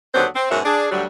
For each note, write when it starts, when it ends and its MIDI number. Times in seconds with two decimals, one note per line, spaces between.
0.14 0.28 39
0.14 0.28 50
0.14 0.28 54
0.14 0.28 59
0.14 0.28 62
0.14 0.28 72
0.35 0.49 60
0.50 0.61 44
0.50 0.61 47
0.50 0.61 54
0.50 0.61 61
0.50 0.61 70
0.50 0.61 76
0.65 0.87 62
0.65 0.87 68
0.91 1.05 38
0.91 1.05 54
0.91 1.05 55